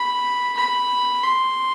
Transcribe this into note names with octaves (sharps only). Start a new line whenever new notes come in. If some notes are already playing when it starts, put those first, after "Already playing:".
Already playing: B5
B5
C6